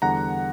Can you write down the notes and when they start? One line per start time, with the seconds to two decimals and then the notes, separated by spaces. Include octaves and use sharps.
0.02 E2 D3 G3 F#5 A#5